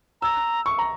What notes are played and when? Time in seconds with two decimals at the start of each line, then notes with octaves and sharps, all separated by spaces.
0.22 A#5 E6
0.66 C#6
0.79 A#5